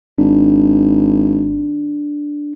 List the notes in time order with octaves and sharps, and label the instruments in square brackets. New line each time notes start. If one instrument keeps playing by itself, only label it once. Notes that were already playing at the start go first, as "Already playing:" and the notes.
[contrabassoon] G#1 [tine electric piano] D4